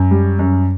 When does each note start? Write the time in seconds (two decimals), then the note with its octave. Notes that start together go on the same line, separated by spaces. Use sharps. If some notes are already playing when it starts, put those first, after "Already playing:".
Already playing: F#2
0.11 G3
0.39 F#2